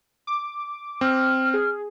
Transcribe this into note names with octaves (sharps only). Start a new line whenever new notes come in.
D6
C4 F6
G#4